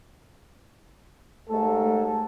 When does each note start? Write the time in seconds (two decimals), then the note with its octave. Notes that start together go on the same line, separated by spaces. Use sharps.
1.49 D#2 G#2 A3 A4